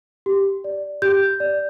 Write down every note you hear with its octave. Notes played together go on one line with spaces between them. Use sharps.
G4
D5
G4 G6
D5